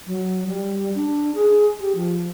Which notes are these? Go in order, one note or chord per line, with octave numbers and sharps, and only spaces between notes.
F#3
G3
D4
G#4
G4
F3